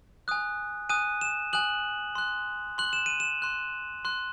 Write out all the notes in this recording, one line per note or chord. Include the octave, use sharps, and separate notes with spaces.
G#5 D#6 F#6
G#5 D#6 F#6 D#7
E7
G#5 D#6 F#6 F#7
C6 F#6
C6 F#6 F#7
E7
D#7
E7
C6 F#6
C6 F#6